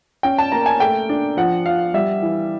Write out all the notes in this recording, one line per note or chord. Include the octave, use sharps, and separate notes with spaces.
C#4 G5
A5
A#3 A#5
G#5
A3 G5
D4
F3 F#5
F3 F5
G3 E5
E3